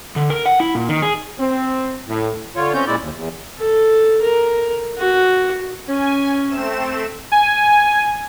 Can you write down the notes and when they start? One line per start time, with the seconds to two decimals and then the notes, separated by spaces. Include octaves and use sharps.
0.16 D3
0.30 A#4
0.45 F#5
0.60 E4
0.75 A#2
0.89 D#3
1.02 G#4
1.39 C4
2.07 A2
2.56 D3 F4 C#5
2.74 C4 C#4 C#5 G6
2.87 A#2 G#3 E4 D5
3.01 D#2
3.15 E2
3.58 A4
4.22 A#4
4.98 F#4
5.89 C#4 G#5
6.49 A3 C4 E7
7.32 G#5